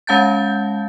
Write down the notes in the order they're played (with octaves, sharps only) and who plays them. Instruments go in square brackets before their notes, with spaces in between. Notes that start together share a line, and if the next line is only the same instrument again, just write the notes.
[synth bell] G#3 C#4 F5 A5 G6 A6